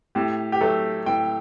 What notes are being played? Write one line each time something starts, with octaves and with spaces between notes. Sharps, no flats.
A2 G4
G4
F#3 A3 A4
A2 G5